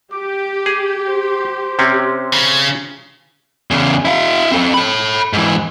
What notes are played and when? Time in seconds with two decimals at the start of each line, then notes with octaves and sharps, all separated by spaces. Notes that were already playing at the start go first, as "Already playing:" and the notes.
0.13 G4 D6
0.66 G#4
1.08 C5
1.79 C3 C4 C#4
2.33 C#3
3.71 E2 C#3
4.05 E4 F5
4.52 C4 A4
4.74 A4 B5
5.33 G#2 E3